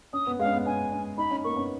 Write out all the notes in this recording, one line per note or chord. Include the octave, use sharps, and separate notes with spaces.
C#4 D#6
B3
G#3 F5
C#4
B3
C#4 G#5
C#4
D#4 B5
C#4
A#3 C#6
B3
C#4